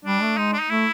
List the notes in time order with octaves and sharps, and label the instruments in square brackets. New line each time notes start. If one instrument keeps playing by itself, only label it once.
[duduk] G3 [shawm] D4
[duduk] A3
[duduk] G#3 [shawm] D#4
[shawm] D4
D#4
[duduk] A3 [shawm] E4